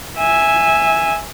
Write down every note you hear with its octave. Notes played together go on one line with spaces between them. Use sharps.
E5 G#5